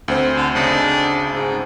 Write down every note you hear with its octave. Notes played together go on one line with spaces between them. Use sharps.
D2 C4 C5
D3
C#3 D4 D#4
G#2